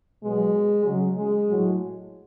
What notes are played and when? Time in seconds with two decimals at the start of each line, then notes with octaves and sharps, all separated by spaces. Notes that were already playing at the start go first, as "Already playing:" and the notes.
0.22 B2 F#3 G#3
0.84 C#3 F#3
1.15 G#3
1.47 A2 F#3